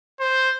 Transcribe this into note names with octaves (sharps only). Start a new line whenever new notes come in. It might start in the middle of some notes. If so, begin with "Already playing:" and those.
C5